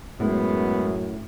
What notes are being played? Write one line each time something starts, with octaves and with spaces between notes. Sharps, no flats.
F#2 A2 G#3 B3